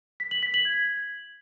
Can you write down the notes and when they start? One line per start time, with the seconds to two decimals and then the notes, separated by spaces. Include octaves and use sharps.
0.20 B6
0.31 F#7
0.43 B6
0.54 F#7
0.65 G#6